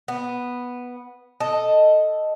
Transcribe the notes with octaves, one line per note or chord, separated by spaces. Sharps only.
B3
A4 D#5